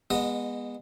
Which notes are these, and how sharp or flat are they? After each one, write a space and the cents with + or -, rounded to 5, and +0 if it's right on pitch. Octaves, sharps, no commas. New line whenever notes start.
G#3 -30 B3 -25 D#5 +0